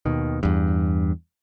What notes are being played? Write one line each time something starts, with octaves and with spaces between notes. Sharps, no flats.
D#2 B2 D#3
E2 G2